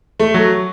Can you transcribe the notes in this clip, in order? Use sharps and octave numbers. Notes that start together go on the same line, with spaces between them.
A3
F#3